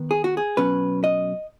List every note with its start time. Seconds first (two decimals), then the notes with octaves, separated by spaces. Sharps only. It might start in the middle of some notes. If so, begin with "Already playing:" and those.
Already playing: D#3 B3
0.11 G#4
0.24 F#4
0.37 G#4
0.57 B2 F#3 C#4 B4
1.04 D#5